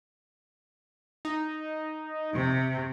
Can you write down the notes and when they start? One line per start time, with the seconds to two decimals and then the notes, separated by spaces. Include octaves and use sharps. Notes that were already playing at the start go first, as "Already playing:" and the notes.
1.25 D#4
2.34 C3